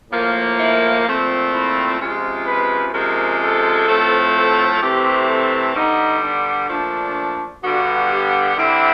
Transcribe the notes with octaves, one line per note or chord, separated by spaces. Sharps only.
A2 F3 A#3
E4
A#2 F3 A3 C4
E4
C3 F3 G#3 C#4 F4
B4
C3 F3 G#3 C#4 A#4
A4
A2 F3 A3 C4
A4
C3 E3 A3 C4 G4
A4
D3 G3 B3 D#4
D4
A#2 F3 A3 D4
G2 D3 G3 B3 F#4
G4
D3 G3 C4 E4